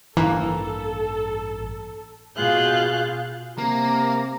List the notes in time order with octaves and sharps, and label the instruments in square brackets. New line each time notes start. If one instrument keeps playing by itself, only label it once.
[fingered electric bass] A1 G2 D4 [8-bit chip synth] E3 [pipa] A#3 [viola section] A4
[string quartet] B2 F4 G#4 F5 F#6 G6
[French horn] C3 [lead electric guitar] A#3 [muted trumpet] A#5